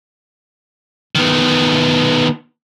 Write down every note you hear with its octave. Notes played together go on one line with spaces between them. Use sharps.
D#3 B3